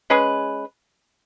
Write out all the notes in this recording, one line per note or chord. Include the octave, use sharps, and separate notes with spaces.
G#3 C#4 G#4 B4